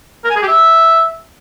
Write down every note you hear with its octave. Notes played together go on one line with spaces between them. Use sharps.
A#4
G#5
G#4
G4
E5